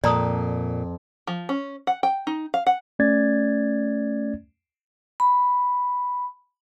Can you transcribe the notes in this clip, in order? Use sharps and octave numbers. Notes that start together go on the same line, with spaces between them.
F2 A#2 D5 A#5 D#6
F3
C#4
F#5
G5
D#4
F5
F#5
A3 C#4 D5 G#6 A6
B5